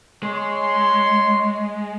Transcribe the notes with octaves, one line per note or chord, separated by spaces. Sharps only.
G#3 C#5 C6